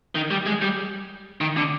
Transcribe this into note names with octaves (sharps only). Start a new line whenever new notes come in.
D#3
G3
G#3
G3
D#3
D3